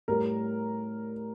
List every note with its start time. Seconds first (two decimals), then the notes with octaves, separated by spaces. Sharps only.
0.08 A2 G3 A#4